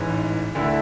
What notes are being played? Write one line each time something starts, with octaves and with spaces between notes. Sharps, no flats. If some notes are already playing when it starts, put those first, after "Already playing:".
Already playing: A1 G#2 E3
D2 D3 A3 E4